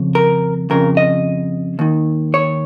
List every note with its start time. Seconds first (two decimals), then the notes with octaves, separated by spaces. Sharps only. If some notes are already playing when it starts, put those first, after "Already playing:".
Already playing: F2 C#3
0.15 A#4
0.70 F2 C#3 A#4
0.97 D#5
1.79 D#2 D#3
2.34 C#5